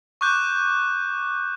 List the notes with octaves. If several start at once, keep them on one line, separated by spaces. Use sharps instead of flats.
C#6 D6 F#6 G6